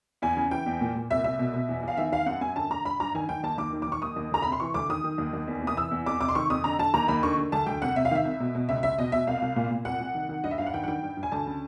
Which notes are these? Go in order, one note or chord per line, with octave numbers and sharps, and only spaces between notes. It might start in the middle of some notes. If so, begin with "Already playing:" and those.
E2 G#5
C#3
E3 G5
E2
A#2
A#2
C2 E5
C2 E5
B2
B2
E2
E2
F5
D#3 E5
D#3 F5
F#2 F#5
F#2 G#5
D3 A5
D3 A#5
G2 B5
G2 A#5
D#3 G#5
D#3 G5
D#2 A5
D#2 D6
D#3
D6
D#3 C#6
D#2 D#6
D#2
D2 A#5
B5
C3
C6
E3 C#6
D2 D6
D#3 D#6
D#3
D#2
D#2
E2
C3
D#6
E3 E6
E2
F2 D6
C3 D6
C6
D#3 C#6
F2 D#6
D3 A#5
D3 A5
D#2 A#5
D#2 B5
D3 C#6
D3
D2 A5
D2 G5
C2 F#5
C3 E5
F5
D#3 E5
C2
B2
B2
C#2 E5
C#2 E5
B2 D#5
B2 E5
C2 F5
C2
A#2
A#2
C2 F#5
C2
D#3
D#3
G2 D#5
E5
G2 F5
F#5
D#3 G5
F#5
D#3 G5
G2
G2
G#5
D2 A5
C#3